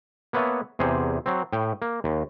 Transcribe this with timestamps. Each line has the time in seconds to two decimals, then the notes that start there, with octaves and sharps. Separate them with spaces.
0.33 A#3 B3 B4 C#5 E5 A5
0.79 E2 C3 G#4 C5
1.26 F#3 C4
1.53 A2 G5
1.82 A#3
2.04 D#2